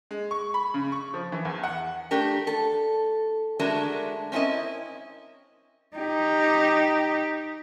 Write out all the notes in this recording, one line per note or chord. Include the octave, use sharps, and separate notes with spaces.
G#3
C#6
B5
C#3
C#6
F3
E3
E2
F#5
A3 D4 G4 A#4
A4
D3 G#3 A3 D4 F#4 A#4
C4 C#4 E4 A#4 D#5
D#4 G4